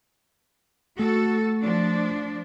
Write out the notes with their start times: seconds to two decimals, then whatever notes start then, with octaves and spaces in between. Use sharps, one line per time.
0.99 A3 F#4 A4
1.63 F3 D4